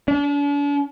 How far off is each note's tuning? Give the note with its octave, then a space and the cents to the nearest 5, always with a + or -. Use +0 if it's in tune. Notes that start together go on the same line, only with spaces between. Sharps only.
D4 -40